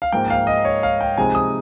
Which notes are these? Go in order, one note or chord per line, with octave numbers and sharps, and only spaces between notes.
F5
G#2 F3 A#3 G5
F5
D#5
C#5
F5
G5
C3 F3 G#3 D#4 G#5
D#6